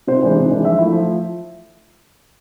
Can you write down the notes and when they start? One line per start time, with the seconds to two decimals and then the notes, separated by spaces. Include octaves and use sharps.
0.07 C3 C5
0.22 E3 G#3 D4
0.36 C3
0.50 E3 G#3 D4
0.64 F3 E5
0.79 A3 E4
0.92 F3